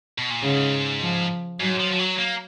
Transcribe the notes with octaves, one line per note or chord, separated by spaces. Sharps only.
B2
A#2
G#2 C#3
F3
G#2 F#3
F3
F3
F#3
A#3